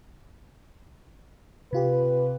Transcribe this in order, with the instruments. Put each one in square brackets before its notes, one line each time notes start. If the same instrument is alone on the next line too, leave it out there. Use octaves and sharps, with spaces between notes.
[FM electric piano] C3 F4 G4 [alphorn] B4